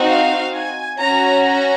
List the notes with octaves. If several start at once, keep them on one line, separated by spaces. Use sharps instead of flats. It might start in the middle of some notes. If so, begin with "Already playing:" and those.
Already playing: C4 D#4 F#4
F5
G#5
C#4 F#4 A#5
A#5